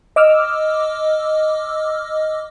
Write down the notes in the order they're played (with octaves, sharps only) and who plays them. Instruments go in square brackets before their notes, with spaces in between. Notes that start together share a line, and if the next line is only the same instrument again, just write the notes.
[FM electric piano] D#5 D6 E6 F6